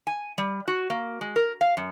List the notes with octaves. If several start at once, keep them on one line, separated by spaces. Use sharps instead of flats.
G#5
G3
F#4
A#3
G#3
A#4
F5
F#2